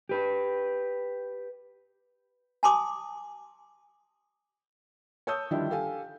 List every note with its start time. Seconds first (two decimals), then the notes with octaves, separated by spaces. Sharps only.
0.09 G4 B4
2.63 G#5 A5 C6 D6 D#6
5.27 C#5 A5 D#6 E6 G6
5.51 D3 D#3 F3 G3 D4 E4
5.70 G4 A4 F5 G#5